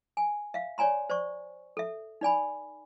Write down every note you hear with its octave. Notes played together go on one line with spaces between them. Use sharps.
G#5
E5 F5
C#5 D5 G#5 A#5 C6
C5 D5 C#6
A4 E5
D#4 D5 G#5 B5